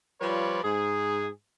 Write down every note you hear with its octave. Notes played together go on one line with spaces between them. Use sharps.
F3 G3 F4 B4 C#5 D5
G#2 G#4